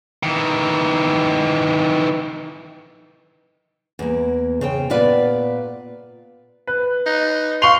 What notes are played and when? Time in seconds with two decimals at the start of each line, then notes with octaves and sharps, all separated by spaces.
0.23 D#3 E3
3.99 E2 A#3
4.61 C#3 C5 G5
4.90 A#2 B3 F4 B4 D5
6.67 B4
7.06 D#4
7.62 F5 C6 C#6 F7